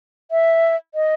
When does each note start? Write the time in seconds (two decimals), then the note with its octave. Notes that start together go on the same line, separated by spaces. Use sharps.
0.31 E5
0.95 D#5